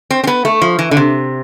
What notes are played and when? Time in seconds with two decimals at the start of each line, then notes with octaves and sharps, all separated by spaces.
0.11 C4
0.24 C4
0.27 B3
0.45 A3
0.62 F3
0.79 E3
0.91 D3
0.97 C3